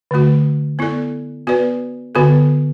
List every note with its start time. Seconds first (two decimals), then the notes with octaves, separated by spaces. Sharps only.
0.11 D3 A3 F#4
0.79 B3 E4 A4 D5
1.47 B3 F#4 B4 D5
2.15 D3 B3 F#4 A4